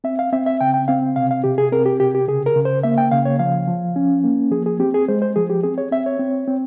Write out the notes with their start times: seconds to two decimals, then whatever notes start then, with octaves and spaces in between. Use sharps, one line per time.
0.04 C4 E5
0.19 F5
0.33 C4 E5
0.46 E5
0.61 C#3 G5
0.74 G5
0.88 C4 F5
1.16 C3 F5
1.31 F5
1.44 C3 G4
1.58 G#4
1.72 C4 A#4
1.86 G4
2.00 C3 G4
2.15 G4
2.28 C#3 G#4
2.46 A#4
2.56 C#3
2.65 C5
2.83 A#3 E5
2.98 G5
3.11 C#3 F5
3.25 C#5
3.39 F3 F5
3.68 F3
3.96 C#4
4.24 A#3
4.51 F3 G#4
4.66 G#4
4.79 C4 G4
4.94 G#4
5.08 G#3 C5
5.22 C5
5.36 F3 G#4
5.50 G4
5.63 C4 G#4
5.78 C#5
5.92 C4 E5
6.06 C#5
6.19 C4
6.48 C4